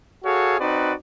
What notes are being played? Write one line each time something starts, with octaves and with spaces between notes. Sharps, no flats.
F#4 G#4 A4 C#5 F5
C4 D#4 F#4 B4 D5